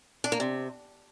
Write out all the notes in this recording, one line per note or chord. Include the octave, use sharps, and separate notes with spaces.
D4
A#3
C3